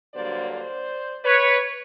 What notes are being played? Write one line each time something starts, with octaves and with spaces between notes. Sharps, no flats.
G2 D3 F#3 A#3 C5 D5
C5 D5
B4 C#5